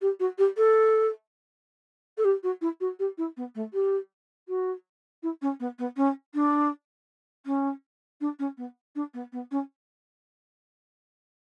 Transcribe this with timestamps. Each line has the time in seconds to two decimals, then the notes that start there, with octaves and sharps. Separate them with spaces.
0.01 G4
0.19 F#4
0.38 G4
0.57 A4
2.17 A4
2.24 G4
2.43 F#4
2.61 E4
2.80 F#4
2.99 G4
3.17 E4
3.37 B3
3.55 A3
3.73 G4
4.48 F#4
5.23 E4
5.42 C#4
5.60 B3
5.78 B3
5.96 C#4
6.34 D4
7.46 C#4
8.20 D4
8.39 C#4
8.57 B3
8.95 D4
9.13 B3
9.32 B3
9.51 C#4